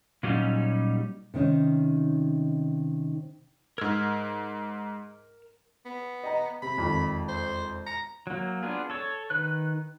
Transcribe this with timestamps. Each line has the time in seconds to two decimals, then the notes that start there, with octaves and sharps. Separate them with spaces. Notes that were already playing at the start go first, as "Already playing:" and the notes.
0.23 A#2 F#3 G3 C#4 D#4
1.34 C3 D#3 C#4 D#4
3.78 G#2 A#4 E6 F6 G#6
5.85 B3
6.24 D#5 G5 A#5
6.62 C3 B5
6.77 E1 F2 D#3
7.29 C5
7.87 A#5 C#7
8.27 F#3 A#3
8.63 B3 D4 F4 G#4
8.90 A4 C#5
9.30 D#3 B4 F#6